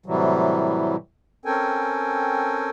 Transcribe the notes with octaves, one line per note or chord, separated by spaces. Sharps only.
A2 C3 E3 F#3 G3
C4 C#4 A4 A#4 G5 G#5